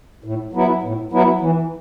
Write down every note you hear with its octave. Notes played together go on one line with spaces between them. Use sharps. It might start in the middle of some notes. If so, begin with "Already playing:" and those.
A2
F#3 B3 E4
A2
F#3 B3 E4
E3